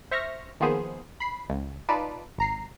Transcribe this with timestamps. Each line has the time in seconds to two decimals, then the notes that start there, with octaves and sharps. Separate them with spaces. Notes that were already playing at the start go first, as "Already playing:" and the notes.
0.11 C5 E5 C#6 F6 A#6
0.60 D#3 F3 A#3 B3 G#4 C5
1.20 B5 C7
1.50 C#2
1.89 D#4 F4 B4 D5 A5
2.38 G#1 A#5 C7